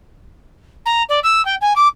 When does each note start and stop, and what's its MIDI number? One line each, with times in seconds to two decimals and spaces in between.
0.86 1.03 82
1.09 1.20 74
1.23 1.44 88
1.45 1.55 79
1.61 1.73 80
1.76 1.88 86